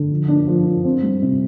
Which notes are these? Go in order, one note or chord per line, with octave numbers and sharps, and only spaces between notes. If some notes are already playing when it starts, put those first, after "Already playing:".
Already playing: D3
F3
D4
F3
D4
C4
G3
C3